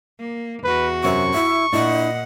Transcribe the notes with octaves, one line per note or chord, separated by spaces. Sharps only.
A#3
E2 F#4 B4
F#2 C3 E5 C#6
E4 E5
A#2 D4 E4 D#5 F#5